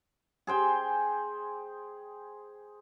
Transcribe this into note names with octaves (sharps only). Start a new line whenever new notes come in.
G#4 C5 G5 G#5